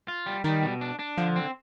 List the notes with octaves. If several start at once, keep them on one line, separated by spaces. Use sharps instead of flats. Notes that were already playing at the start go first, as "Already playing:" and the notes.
F4
G3
D#3 G3
B2
D4
D4
D3 F3
C4